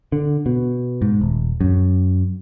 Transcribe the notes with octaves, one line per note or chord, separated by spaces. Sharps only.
D3
B2
G#2
D#1
F#2